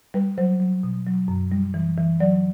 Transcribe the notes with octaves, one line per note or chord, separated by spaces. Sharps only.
G3 B4
F#3 C5
F#3
B2
F#3
F#2
G3
E3
E3
F#3 D5